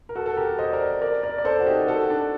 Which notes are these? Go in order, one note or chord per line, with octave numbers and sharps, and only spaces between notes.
A#4
F#4 A4
A4
G4 A#4
C5 D#5
A#4 D5
A#4 D5
A#4 D5
D5
A4 C5
F#4
D#4 G4
F#4 A4
D4